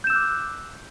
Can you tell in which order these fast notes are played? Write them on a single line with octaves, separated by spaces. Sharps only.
G6 E7 E6 F#6 D6